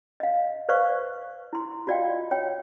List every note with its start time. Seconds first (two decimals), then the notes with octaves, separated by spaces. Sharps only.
0.20 D#5 F5
0.69 B4 C5 D5 F5 C#6
1.53 E4 C6
1.87 F4 F#4 D5 D#5 F5 G5
2.31 C#5 G5